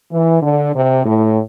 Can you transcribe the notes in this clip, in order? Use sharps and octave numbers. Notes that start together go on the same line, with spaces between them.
E3
D3
C3
A2